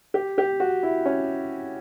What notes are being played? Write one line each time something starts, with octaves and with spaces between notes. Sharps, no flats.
G4
G4
F#4
E4
C#4